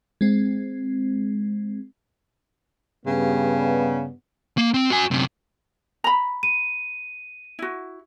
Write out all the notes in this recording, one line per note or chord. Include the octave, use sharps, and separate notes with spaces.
G#3 C4
G2 C#3 B3
A#3
C4
F#4 G#5
F#2 C3
A#5 B5
D#7
E4 F#4